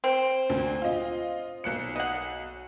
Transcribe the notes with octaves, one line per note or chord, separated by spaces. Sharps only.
C4
D2
F4 D#5
B1 F#6 C#7
D#5 F#5